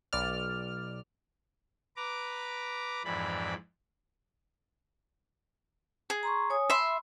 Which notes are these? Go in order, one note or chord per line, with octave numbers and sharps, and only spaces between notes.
B1 D5 F6
B4 A#5 D6
F2 G#2 E3 D5 B5
G#4
A#5 C6 C#6
C#5 G#5 D#6
E5 B5 C6